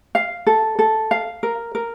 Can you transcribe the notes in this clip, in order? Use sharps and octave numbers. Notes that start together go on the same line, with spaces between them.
F5
A4
A4
F5
A#4
A#4